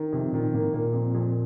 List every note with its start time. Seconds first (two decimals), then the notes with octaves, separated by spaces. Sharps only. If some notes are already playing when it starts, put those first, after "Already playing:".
Already playing: D#3
0.13 F2 C3
0.33 A#2 D#3
0.54 A2 A#3
0.74 A#2 A#3
0.93 F2
1.14 F2